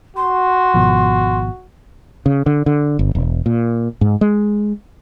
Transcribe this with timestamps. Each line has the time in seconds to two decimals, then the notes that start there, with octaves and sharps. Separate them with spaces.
0.17 F#4 C6
0.74 G#1 B2 F3
2.26 C#3
2.46 D3
2.66 D3
2.99 G1
3.15 E1
3.46 A#2
4.01 G#2
4.21 G#3